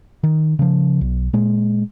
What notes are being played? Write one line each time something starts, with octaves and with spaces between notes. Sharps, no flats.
D#3
C#3 F3
B1
A#2 G#3